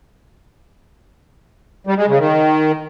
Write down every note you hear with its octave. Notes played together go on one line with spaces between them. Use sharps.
G3
G#3
C#3
D#3